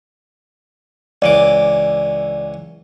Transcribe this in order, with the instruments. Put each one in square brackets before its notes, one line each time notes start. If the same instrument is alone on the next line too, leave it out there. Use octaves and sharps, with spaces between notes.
[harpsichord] C#2 E3 D6 [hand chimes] D5